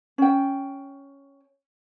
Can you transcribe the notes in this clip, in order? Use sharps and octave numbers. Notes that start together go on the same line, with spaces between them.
C#4 G5